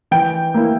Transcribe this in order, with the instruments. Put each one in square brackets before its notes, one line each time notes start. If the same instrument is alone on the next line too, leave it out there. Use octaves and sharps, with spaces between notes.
[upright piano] E3 G5
A#3 E4